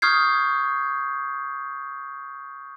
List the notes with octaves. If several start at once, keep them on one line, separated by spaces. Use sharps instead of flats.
C#6 D#6 F6 G6 G#6 C7